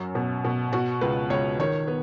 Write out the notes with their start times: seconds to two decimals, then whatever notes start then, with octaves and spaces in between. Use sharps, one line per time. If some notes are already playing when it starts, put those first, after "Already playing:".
Already playing: F#2 F#3
0.15 B2
0.45 B2
0.73 B2 F#4
1.01 C#2 B4
1.30 C#2 C#5
1.59 D#3 C#5
1.87 B3